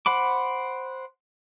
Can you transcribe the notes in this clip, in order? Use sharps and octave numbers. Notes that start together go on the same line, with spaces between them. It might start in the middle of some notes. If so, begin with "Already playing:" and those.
C5 F#5 B5 D6